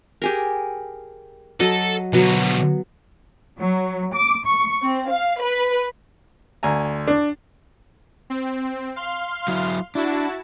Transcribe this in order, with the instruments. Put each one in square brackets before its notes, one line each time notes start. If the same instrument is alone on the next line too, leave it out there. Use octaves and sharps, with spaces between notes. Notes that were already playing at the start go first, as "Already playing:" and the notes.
[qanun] G4 G#4 A#4
[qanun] F#3 D#5 [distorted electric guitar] A4
[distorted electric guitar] B2 D3 [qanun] F#3 B3 A#5
[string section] F#3
D6
C#6
C4
F5
B4
[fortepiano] D2 G#5 A#5
[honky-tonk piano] D4
[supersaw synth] C4
F5 C6 F6
[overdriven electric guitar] F#3 E4
[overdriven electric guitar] D4 [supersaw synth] E4 F#4 A5